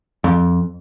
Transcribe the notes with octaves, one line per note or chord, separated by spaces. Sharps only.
F2